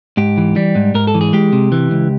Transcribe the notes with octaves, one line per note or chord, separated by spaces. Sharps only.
G#2 G4
E3
G3
G#2
G#2 A#4
A4
E3
G#4
G#3 G4
C3
E3
C#2